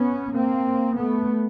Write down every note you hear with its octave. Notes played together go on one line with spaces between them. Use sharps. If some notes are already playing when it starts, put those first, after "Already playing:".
Already playing: B3 C#4
A#3 C4
A3 B3